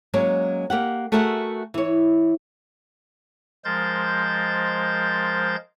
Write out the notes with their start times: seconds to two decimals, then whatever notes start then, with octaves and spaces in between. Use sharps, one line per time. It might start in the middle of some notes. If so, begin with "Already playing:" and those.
0.14 F#3 G#3 A#3 C#4
0.70 A#3 G4 F#5
1.12 A3 F#4 G#4 A#4 E5 F#5
1.74 E3 C#5
3.65 F3 G#3 A#4 C5 G6 A6